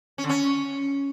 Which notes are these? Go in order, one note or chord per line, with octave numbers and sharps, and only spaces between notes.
C#4
D3
C#4